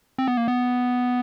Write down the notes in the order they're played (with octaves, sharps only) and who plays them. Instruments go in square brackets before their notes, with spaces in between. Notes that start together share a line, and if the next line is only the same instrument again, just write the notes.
[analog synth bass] C4
B3
A#3
B3